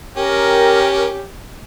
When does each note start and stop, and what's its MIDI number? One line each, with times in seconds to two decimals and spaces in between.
0.17 1.22 61
0.17 1.33 67
0.17 1.09 70
0.17 1.09 79